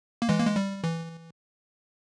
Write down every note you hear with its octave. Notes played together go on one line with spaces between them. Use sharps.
A#3
E3 G#3
A#3
G#3
G3
E3